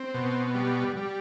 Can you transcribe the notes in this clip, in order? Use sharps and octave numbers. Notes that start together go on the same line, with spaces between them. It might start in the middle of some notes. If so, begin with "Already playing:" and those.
Already playing: C4
B2
G3
G3